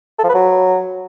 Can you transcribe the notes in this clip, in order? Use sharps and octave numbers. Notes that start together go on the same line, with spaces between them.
A4
F3
B4
F#3